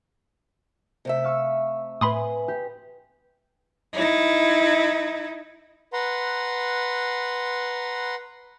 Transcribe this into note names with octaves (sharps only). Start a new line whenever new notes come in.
C3 A3 E5
F5 C#6 E6
A2 B4 G#5 B5 C6 D#6
G4
D#4 E4
B4 F#5 A#5 C6